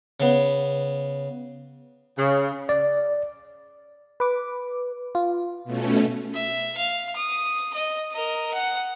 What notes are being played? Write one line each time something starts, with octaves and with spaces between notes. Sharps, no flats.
C#3 B3
C#3
D5
B4 D6
F4
B2 A3 C#4
E5
F5
D#6
D#5
A#4 D#5
F#5